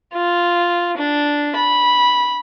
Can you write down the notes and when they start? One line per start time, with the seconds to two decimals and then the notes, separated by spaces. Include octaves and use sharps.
0.13 F4
0.97 D4
1.56 B5